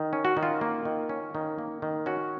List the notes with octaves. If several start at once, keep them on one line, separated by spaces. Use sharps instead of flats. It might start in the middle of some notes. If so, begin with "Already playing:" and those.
Already playing: D#3
C#4
F#4
D#3
F4
A#3
D#3
C#4
D#3
A#3
D#3
C#4 F#4